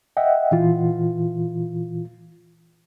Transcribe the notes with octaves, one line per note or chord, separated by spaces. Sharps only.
D#5 E5 F#5 G5
A#2 E3 F4